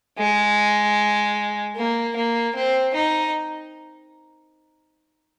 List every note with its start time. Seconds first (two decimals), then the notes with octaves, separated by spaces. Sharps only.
0.18 G#3
1.76 A#3
2.17 A#3
2.56 C4
2.95 D#4